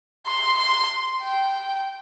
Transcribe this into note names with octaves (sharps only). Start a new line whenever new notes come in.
C6
C6
G5